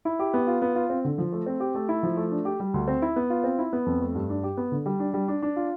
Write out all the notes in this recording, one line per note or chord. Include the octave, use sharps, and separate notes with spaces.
E4
G4
B3
F4
B3
F4
C4
D3
F3
A3
C4
G4
A3
E4
F3
A3
D4
G4
G3
D2
C4
E4
B3
F4
C4
E4
B3
F2
A3
G2
D4
G4
B3
D3
G3
D4
G3
D4
D4
F4